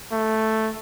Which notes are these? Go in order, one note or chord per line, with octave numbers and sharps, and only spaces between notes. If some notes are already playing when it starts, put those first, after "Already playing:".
A3